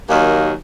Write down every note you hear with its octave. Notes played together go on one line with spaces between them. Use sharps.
D#2 D#3 F#3 A#3